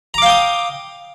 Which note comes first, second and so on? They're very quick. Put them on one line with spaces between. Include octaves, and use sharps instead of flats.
A#5 D6 F5 G5 D#6